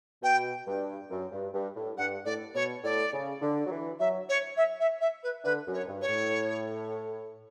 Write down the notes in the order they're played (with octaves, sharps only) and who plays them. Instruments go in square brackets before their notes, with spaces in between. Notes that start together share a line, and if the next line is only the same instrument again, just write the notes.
[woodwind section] B2 [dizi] G5
[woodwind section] G2
F#2
G2
G2
A2
[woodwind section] G2 [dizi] F#5
[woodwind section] A2 [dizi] D5
[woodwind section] B2 [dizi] C#5
[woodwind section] A2 [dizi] D5
[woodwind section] C#3
D3
F#3
E3
[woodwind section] F#3 [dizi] E5
[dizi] C#5
E5
E5
E5
B4
[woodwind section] D3 [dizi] B4
[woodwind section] F#2
[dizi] C#5
[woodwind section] G2
[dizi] C#5
[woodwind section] A2